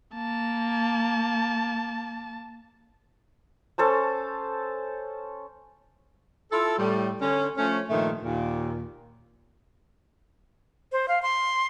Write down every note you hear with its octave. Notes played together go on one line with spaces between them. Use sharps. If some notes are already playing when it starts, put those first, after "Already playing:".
A#3 A5
C#4 A4 C5 A5
E4 F4 A4
A2 G3
D3 C#4
F3 A3 C#4
G2 A#2 D#3 F3 A3
D#2 A#2
C5
F5
C6